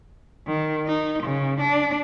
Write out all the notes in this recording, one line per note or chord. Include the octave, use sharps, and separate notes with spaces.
D#3
D#4
C#3
D4